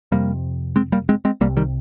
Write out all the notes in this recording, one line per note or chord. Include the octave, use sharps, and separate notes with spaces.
F2 C3 G3 A#3
G#3 C4
G3 A#3
G#3 C4
G#3 C4
C2 C3 G3 A#3
D#3 G3